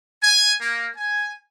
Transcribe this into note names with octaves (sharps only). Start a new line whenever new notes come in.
G#5
A#3
G#5